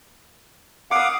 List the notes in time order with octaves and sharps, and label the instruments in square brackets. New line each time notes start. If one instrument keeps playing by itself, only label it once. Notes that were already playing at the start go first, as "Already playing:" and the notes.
[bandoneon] F5 F#5 [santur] D6 D#6